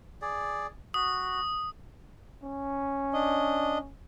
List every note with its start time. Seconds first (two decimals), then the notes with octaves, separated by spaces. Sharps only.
0.22 G#4 D5
0.94 F#4 D#6
2.43 C#4
3.13 D4 D#5